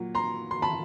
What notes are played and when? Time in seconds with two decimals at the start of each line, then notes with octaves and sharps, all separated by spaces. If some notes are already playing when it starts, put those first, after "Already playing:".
Already playing: A#2 F#3
0.15 A#5 C6
0.51 C6
0.62 A5 B5